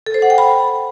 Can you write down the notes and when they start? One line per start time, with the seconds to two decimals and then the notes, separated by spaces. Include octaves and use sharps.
0.06 A4
0.14 C5
0.22 F#5
0.30 G5
0.38 B5